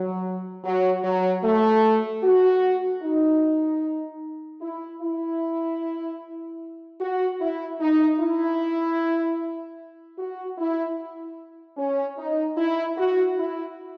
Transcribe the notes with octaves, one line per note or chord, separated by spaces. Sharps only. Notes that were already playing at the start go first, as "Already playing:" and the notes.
Already playing: F#3
F#3
F#3
A3
F#4
D#4
E4
E4
F#4
E4
D#4
E4
F#4
E4
C#4
D#4
E4
F#4
E4